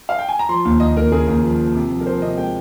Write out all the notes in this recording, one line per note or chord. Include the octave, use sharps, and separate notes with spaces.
F5
G5
G#5
A#5
F3 C6
D#2
D#2 D#5
D#2 A#4
C#3 G#4
D#2
F3
F3
C3
F3
A#4
F3 C5
C3 D#5
G#3 G5